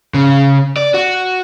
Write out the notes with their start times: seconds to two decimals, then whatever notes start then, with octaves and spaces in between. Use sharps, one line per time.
0.14 C#3
0.77 D5
0.94 F#4